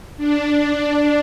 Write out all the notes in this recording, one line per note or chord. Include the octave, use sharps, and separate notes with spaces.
D4